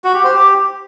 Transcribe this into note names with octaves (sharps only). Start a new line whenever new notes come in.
F#4
G4
C5
G4